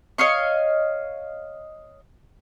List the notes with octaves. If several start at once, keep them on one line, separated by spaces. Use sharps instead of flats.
C#5 D#5 F5 C#6